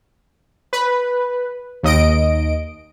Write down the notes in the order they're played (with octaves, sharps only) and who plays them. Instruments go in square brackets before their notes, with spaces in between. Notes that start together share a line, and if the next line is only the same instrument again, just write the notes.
[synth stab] B4
D#2 D#5 D7